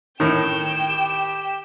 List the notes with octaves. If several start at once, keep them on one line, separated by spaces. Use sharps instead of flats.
A2 D#3 G5 E7
G4